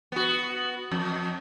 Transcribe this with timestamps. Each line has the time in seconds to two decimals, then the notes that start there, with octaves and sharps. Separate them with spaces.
0.12 B3 F#4
0.92 F2